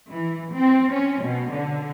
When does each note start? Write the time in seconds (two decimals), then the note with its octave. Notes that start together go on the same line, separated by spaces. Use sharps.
0.11 E3
0.53 C4
0.92 C#4
1.21 B2
1.54 D3